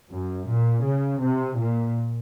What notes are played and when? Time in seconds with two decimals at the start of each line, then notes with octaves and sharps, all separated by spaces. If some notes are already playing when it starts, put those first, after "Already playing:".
0.11 F#2
0.48 A#2
0.84 C#3
1.21 C3
1.57 A#2